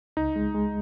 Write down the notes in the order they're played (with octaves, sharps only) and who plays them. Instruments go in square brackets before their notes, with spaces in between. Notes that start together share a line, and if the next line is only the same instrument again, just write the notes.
[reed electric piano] C#2 [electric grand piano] D#4
[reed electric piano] G#3
G#3